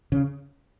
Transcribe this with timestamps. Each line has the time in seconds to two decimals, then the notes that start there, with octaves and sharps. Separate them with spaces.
0.12 C#3